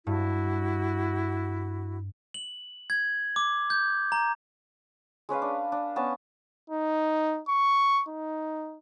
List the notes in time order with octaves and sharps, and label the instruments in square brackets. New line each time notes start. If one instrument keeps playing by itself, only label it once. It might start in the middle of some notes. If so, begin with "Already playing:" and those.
[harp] G2 [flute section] E4 F#4
[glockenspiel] F#7
G#6
D6
G6
A#5
[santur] G#3 C#4 B4 F5
D4
D4
B3 C#4 A5
[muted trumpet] D#4
C#6
D#4